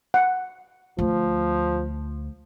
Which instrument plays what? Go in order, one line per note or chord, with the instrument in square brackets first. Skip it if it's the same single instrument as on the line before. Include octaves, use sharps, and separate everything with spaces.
[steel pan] F#5
[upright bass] D2 [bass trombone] F3